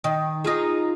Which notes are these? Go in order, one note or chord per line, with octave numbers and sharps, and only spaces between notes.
D#3
D#4 F4 G#4